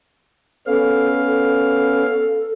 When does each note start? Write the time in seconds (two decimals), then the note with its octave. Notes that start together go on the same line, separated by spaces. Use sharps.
0.67 B3 C#4 A4 F5
1.26 A4